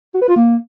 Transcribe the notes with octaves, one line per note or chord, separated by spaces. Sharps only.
F#4
B4
F4
A#3